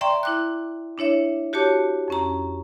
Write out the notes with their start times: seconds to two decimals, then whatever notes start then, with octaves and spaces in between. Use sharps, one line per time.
0.01 D5 E5 G5 A#5 C6 C#6
0.23 E4 D6 F#6
0.98 D4 E4 C#5 E5
1.53 F#4 G4 C#5 A5 D6
2.08 F2 C#4 A#5